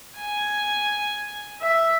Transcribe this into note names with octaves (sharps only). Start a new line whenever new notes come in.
G#5
E5